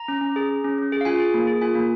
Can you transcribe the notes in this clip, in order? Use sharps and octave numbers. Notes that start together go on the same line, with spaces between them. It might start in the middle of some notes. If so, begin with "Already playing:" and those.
Already playing: A#5
C#4
C#4
G#4
G#4
C#4
C#4
G#4
F5
F4 G#5
G#4
A#3
G#4
F4 G#5
A#3